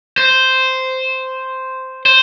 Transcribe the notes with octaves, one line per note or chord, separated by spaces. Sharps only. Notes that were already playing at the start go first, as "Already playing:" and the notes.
C5
C5